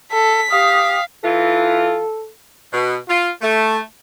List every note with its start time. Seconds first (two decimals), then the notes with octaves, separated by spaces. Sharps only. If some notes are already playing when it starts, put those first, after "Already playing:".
0.12 A4 B6
0.51 G4 F5 G5 D#6
1.24 E3 F4 A4
2.72 B2
3.08 F4
3.41 A3